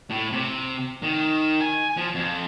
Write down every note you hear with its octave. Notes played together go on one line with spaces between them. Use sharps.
A2
C3
D#3
G#5
F3
F2